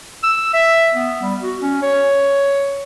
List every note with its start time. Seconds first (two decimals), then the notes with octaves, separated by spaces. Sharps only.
0.23 E6
0.54 E5
0.94 B3
1.22 G3
1.41 F#4
1.61 C#4
1.82 C#5